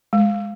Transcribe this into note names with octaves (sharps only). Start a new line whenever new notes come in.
G#3